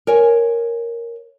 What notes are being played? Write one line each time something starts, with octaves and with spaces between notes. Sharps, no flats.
A#4 C#5 G#5